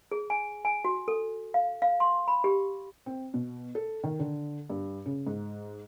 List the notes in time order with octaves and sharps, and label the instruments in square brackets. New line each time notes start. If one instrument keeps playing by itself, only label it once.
[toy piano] G#4
G#5
G#5
F#4
A4
F5
F5
C6
B5
G4
[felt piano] C4
B2
A4
D#3
D3
G2
C#3
G#2